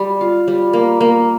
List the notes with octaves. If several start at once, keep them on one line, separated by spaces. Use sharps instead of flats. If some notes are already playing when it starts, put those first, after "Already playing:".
Already playing: G3
F4
G3
A#3
A#3